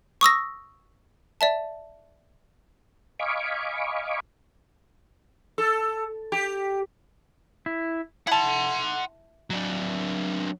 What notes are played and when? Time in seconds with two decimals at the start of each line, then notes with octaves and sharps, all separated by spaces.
0.21 C#6 D#6 E6 A#6
1.41 D5 E5 A5
3.19 D#5 F5 G#5 B5 C#6 D6
5.58 A4
6.32 G4
7.66 E4
8.27 E4 F#5 A5 C6
9.50 F#3 D4